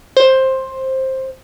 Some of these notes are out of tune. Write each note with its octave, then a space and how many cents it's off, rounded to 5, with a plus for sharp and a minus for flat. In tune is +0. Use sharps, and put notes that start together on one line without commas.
C5 +10